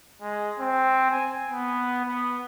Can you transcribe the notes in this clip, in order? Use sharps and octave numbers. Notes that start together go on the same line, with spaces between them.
G#3
C4
G#5
B3
B3